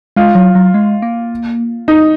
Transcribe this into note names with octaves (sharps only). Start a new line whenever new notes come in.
G#3 F4
F#3
F#3
G#3
A#3
D#4